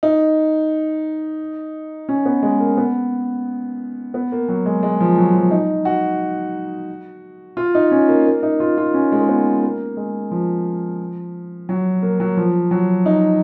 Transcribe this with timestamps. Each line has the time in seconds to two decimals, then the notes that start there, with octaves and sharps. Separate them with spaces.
0.03 D#4
2.09 C#4
2.25 B3
2.43 G#3
2.60 A#3
2.77 B3
4.14 B3
4.32 A#3
4.49 F#3
4.66 G#3
4.83 G#3
5.00 F3
5.17 F#3
5.34 F3
5.51 D#4
5.85 F#4
7.57 F4
7.75 D#4
7.91 C#4
8.08 A#3
8.26 A#3
8.43 D#4
8.60 F4
8.77 F4
8.94 C#4
9.12 G#3
9.21 A#3
9.29 B3
9.63 A#3
9.97 G#3
10.31 F3
11.69 F#3
12.03 A#3
12.20 F#3
12.37 F3
12.71 F#3
13.06 D#4